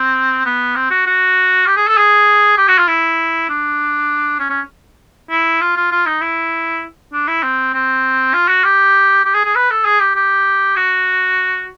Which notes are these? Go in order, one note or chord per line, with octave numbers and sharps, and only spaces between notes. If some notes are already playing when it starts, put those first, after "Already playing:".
Already playing: C4
B3
C4
F#4
F#4
G4
G#4
A4
G#4
G4
F#4
F4
E4
D4
C#4
C#4
E4
F4
F4
F4
D#4
E4
D4
E4
C4
C4
F4
F#4
G4
G4
G#4
G#4
B4
A4
G#4
G4
G4
F#4